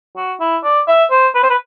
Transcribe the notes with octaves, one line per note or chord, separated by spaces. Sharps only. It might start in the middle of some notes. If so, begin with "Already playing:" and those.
F#4
E4
D5
E5
C5
B4
C5
B4